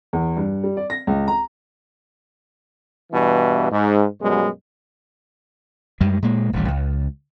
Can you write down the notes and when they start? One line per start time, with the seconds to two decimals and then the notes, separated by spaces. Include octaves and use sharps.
0.13 E2
0.37 G2
0.64 G3
0.77 D5
0.90 A#6
1.07 C#2
1.28 A#5
3.12 G2 B2 E3
3.70 G#2
4.21 F#2 B2 G3 G#3
6.01 F#2 G3 G#3
6.22 A#2 G#3 A#3
6.53 D#1 A1 D2 G3
6.68 C#2